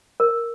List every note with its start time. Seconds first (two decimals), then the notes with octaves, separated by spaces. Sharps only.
0.20 A#4